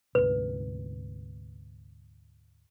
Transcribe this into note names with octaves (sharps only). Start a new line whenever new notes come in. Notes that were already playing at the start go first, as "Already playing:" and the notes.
D2 G#2 C3 B4